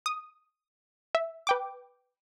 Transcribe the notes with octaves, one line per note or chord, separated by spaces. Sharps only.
D#6
E5
B4 G5 D6